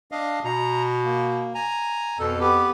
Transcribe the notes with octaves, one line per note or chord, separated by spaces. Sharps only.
D4 D#5 F5
B2 A#5
A#3
G#5 A#5
F2 B2 A4
B3 G4 B4